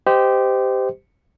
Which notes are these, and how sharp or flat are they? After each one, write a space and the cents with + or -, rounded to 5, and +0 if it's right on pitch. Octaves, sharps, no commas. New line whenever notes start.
G4 +0 C5 -25 D#5 +0